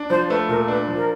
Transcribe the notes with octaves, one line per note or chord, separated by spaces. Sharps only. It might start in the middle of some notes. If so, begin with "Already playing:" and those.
Already playing: D4
F3 C5
A3 B4
A#2 A#4
D4 B4
F3
A#4